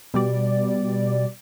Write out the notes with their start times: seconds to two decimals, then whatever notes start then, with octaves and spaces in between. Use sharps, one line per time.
0.14 B2 G3 D5